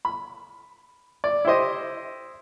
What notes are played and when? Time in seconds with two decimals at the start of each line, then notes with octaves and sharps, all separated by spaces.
0.05 B5
1.24 D5
1.45 E4 G4 C5 D#5